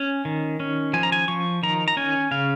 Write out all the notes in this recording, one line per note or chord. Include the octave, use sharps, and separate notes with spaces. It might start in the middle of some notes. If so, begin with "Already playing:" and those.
Already playing: C#4 G#5
D#3
C#4
F3 G#5
A#5
G#5
F3 C#6
D#3 A#5
A#5
C#4 G#5
C#3 F5